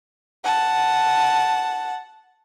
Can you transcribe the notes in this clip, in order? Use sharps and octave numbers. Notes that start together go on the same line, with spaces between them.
F#5 A5